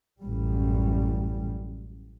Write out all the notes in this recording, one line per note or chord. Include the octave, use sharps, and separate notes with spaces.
A1 F#2 G3